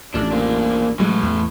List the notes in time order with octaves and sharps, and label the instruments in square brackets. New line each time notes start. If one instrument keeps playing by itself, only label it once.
[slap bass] A1 F2 [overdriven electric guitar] D4
[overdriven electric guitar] A#3 D4
[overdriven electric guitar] A2 E3 [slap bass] F#3 G#3
[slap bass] E2